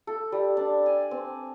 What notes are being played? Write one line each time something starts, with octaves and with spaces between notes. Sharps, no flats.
A4
G3
D4
G#5
C4